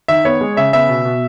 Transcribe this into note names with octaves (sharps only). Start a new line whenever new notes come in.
D#3 E5
B3 C#5
G#3
C#3 E5
B3 E5
B2
B2